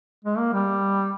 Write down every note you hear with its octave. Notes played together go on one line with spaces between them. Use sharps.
G#3
A#3
G3